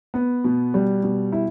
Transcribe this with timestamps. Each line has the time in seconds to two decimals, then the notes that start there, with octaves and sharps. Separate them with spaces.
0.14 B3
0.44 B2
0.74 G3
1.03 B2
1.32 E4